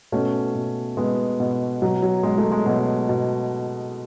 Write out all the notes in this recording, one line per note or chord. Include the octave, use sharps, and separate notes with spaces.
B2 A3 C#4
B2
B2 G#3 B3
B2
B2 F#3
F#3
B2 G#3
F#3 A3
G#3
B2 F#3
B2